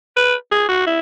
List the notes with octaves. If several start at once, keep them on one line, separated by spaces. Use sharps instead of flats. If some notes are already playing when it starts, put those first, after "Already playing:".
B4
G#4
F#4
E4